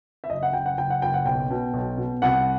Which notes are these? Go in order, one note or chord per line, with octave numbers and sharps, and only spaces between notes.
E5
F#1 D#5
F#5
F#1 G5
F#5
F#1 G5
F#5
F#1 G5
F#5
B1 G5
B2
B1
B2
C2 F#5